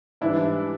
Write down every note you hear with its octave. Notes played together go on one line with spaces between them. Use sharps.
G#2 E3 G3 D4 E4